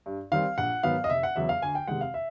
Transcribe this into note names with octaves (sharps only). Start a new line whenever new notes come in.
G2
D#3 G3 C4 F5
A#1 F#5
G#2 D#3 F#3 B3 F5
D#5
F1 E5
F#5
E2 C#3 F#3 B3 E5
F5
D2 G#5
G5
C3 D#3 G#3 F#5
F5
E5